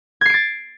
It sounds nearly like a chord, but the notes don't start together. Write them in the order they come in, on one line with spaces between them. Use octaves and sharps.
G#6 C7 D7 A6